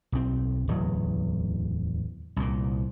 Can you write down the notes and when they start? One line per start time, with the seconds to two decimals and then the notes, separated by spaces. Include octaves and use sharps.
0.12 B1 C4
0.68 D1 E2 F#3
2.36 C2 A#2